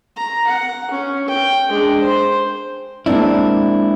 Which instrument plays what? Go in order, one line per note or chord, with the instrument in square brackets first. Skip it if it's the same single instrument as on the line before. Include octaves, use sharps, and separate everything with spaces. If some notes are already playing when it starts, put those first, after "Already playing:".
[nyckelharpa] A#5
F#5
C#4
G5
G#3 D4
C5
[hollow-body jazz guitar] G#3 A#3 C4 D4 E4